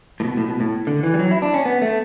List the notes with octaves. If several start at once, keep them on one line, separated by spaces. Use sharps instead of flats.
A2
B2
A2
B2
A2
D3
E3
G3
F#3
E4
D4
C#4
B3
A3